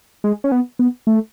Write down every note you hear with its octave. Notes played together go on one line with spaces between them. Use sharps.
G#3
C#4
B3
B3
A3